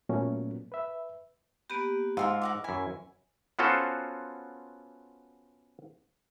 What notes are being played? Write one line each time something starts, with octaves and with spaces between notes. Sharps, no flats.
A#2 F#3 A3 B3 C#4
B4 E5
A#3 B3 G4 B4
G#2 F4 G4 A#4 E6
A#4 F#5 D6
F#2 E4 G#5
B3 C#4 F4 F#4 A4 C5